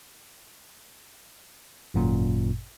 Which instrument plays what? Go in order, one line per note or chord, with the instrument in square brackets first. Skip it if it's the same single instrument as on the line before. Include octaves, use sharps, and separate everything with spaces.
[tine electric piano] G#1 F#2 A#2